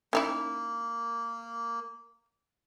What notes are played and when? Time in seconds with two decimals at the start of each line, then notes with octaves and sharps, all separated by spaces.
0.13 A#3 C#4 D#4 E4